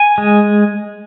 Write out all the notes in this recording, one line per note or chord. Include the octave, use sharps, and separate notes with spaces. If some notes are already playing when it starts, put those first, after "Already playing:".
Already playing: G#5
G#3